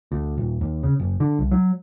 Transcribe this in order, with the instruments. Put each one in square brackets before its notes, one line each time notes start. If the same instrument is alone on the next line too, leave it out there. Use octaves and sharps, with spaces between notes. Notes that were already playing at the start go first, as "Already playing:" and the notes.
[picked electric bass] D2
D#1
D#2
C#3
F#1
D3
C2
F#3